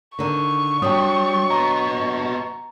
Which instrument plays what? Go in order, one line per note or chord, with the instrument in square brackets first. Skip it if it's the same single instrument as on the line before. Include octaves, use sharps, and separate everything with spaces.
[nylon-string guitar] D3 D#3 [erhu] C#6
[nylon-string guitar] F#3 D4 [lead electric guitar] G3 [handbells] G5 D#6
[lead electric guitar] B3 D#5 [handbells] A#5